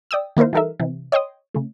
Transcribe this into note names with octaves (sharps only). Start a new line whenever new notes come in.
D5 G5 D#6 E6
D#3 A#3 E4 A#4 C5
E3 G3 D#4 A4 A#4 E5
C3 E3
C#5 D#5 G5 C6 D#6
C#3 A3